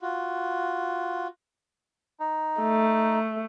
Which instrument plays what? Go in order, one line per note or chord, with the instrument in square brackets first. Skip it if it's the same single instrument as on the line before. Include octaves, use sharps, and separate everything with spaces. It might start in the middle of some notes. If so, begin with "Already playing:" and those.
[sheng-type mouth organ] F4 F#4
[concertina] D#4
[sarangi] A3